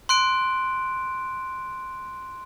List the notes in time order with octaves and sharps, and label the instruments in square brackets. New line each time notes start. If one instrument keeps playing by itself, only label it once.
[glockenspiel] C6 F#6 D7